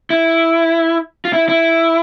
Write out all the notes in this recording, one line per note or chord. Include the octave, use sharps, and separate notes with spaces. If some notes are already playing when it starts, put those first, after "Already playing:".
E4
F4
E4
E4